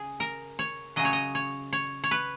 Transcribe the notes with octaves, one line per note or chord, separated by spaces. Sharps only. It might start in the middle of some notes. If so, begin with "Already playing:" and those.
Already playing: C#3 G#4
A#4
C#5
C#3 F#3 D#5
C#5
D#5
C#5
C#5
C#5
B4